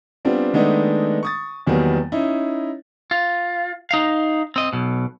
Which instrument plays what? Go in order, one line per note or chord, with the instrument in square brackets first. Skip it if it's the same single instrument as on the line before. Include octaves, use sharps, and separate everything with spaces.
[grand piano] G3 B3 C4 D4 F4
D#3 G#3 A3 B3 D4 D#4
C#6 D#6 A6
E2 D#3 F#3 G3 A#3 B3
C#4 D#4 E4
[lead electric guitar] F4
D#4 F5
C4 D#5
B1 B2